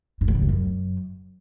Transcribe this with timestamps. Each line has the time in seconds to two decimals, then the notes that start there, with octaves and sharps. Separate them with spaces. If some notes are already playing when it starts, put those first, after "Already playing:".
0.21 G2
0.28 A2
0.35 C#3
0.42 F2
0.49 F#2